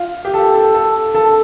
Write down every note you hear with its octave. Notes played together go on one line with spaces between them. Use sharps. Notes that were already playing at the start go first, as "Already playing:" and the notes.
Already playing: F4
G4
A4
A4
A4
A4